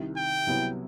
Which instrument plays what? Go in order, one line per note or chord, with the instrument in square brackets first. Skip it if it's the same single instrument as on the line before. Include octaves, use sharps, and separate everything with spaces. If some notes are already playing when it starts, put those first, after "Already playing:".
Already playing: [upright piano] C2 C3 D#3
[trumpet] G5
[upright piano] C2 C3 F#3 B3 E4